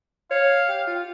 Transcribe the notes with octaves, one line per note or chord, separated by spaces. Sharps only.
C#5 F5
G4
F4